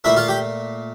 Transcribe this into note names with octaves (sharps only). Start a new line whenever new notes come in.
A#2 A3 E4 E5
F4 F5
G4 G5